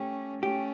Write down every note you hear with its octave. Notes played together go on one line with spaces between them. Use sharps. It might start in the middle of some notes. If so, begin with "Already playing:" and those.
Already playing: A3 C#4 G4
A3 C#4 G4